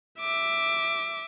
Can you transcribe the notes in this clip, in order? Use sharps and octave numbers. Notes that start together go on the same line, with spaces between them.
E5 D6